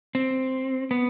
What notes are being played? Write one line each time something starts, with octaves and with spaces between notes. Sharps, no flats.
C4
B3